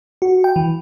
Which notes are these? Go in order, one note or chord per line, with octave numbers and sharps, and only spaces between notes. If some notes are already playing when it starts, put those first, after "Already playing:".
F#4
G5
E3